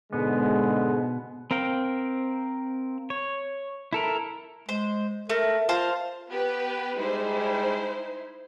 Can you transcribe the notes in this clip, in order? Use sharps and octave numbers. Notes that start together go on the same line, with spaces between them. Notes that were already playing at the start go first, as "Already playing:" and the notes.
G#2 B2 D3 G#3 B3
C4 A#4 F5 G5
C#5
E4 A4 A#4
G#3 C5
A3 A#4
F4 C5 F5 A5
B3 G4 B4
G3 G#3 D#4 E4 C5